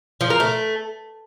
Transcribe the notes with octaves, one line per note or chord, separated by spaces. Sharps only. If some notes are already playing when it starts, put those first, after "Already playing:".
F3
A#4
A3